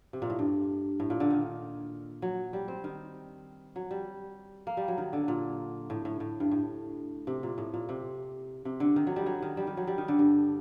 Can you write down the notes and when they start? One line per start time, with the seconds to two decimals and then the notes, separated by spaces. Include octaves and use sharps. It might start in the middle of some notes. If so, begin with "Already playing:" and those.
0.13 C3
0.22 A#2
0.30 A2
0.39 G2
1.00 A2
1.10 A#2
1.20 D3
1.30 D#3
2.22 F#3
2.53 G3
2.68 C4
2.84 D#3
3.76 F#3
3.91 G3
4.67 A#3
4.77 G3
4.88 F#3
4.98 D#3
5.13 D3
5.28 A#2
5.90 A2
6.05 A2
6.20 A2
6.40 G2
6.51 A2
7.27 C3
7.43 A#2
7.58 A2
7.74 A#2
7.89 C3
8.65 C3
8.80 D3
8.96 D#3
9.07 F#3
9.16 G3
9.26 F#3
9.42 D#3
9.57 G3
9.67 D#3
9.77 F#3
9.87 G3
9.98 D#3
10.08 D3
10.19 G2